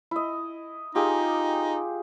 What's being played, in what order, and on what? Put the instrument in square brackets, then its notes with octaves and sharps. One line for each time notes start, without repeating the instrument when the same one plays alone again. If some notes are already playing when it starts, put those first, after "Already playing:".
[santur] E4 D#5
[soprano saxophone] D#4 [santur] F4 G4 G#4